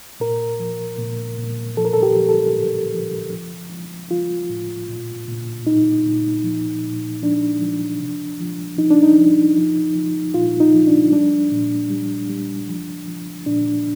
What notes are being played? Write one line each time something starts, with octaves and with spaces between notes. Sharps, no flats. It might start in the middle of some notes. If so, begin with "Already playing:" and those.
A#2 A#4
F3
A#2
A#2
F3 A4
A#4
A4
G4
F3
A4
A2
F3
F3
F3
F3 F4
A2
A#2
A#2
A#2 D#4
A#2
F3
A#2
F3 D4
F3
C3
F3
F3 D#4
D4
D#4
F3
F3
F3
A#2 F4
D#4
F3
D4
G3 D4
A#2
G3
G3
F3
F3
A#2 D4